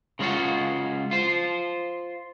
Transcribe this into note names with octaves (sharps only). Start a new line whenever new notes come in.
C#3 G#3 C#4 F4 F#4
F4 C5